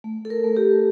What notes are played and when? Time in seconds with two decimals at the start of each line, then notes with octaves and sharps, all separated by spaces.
0.04 A3
0.25 A4
0.30 A#4
0.44 A3
0.57 G4